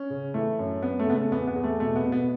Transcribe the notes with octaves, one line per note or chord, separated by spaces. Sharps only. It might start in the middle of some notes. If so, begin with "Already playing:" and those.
Already playing: C#4
C#3
E3 A3
F#2
F#2 B3
A3
C#3 B3
A3
E2 B3
B3
E2
A3
B2 A3
B3
B2
B3